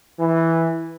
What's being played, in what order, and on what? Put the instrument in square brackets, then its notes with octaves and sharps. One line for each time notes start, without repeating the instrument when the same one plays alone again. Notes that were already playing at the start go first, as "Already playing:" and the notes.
[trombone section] E3